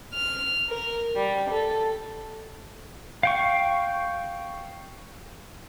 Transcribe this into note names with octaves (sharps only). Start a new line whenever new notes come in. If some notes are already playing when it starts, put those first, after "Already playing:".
F6
A#4
G3
A4
F5 G5 C#6